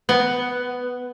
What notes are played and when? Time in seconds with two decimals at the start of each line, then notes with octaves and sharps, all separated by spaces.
0.09 B3